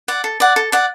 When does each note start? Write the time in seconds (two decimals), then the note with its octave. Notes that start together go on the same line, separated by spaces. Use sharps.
0.08 D5 F#5
0.24 A4
0.40 D5 F#5
0.56 A4
0.72 D5 F#5